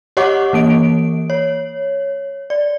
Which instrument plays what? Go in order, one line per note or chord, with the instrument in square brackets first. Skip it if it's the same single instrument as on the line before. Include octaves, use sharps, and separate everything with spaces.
[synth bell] G4 C#5 D#5 F#5 C#6 D6
E3 A#3 D7
C#5
D5